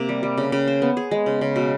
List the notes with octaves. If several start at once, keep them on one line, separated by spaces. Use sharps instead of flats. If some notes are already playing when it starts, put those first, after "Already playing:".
Already playing: C3 A#3
G3
G3
C#3
C#3
C5
B3
G#4
G#3
C#3
C#3
B2